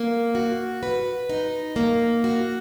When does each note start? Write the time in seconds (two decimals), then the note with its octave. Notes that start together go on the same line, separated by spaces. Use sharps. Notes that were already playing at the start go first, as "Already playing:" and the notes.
Already playing: A#3
0.35 F#4
0.83 B4
1.29 D#4
1.76 A#3
2.24 F#4